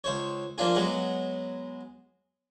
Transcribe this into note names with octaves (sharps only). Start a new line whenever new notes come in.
C#2 C5 C#5
F3 A#3 D4 F4 G#4
F#3 G#3 B3 F#5